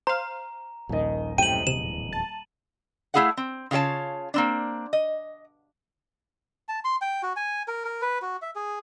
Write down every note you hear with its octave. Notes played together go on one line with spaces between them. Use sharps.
C5 F5 A#5
D#1 A#1 D#3 D#5
F#2 A2 C3 G5 D#7 F#7
D1 E2 C3 E7
A5
A3 D4 E4 G#4 F5 F#5
C4
C#3 F4 G4 C#5 A5
A#3 C4 D4
D#5
A5
C6
G5
F#4
G#5
A#4
A#4
B4
F#4
E5
G#4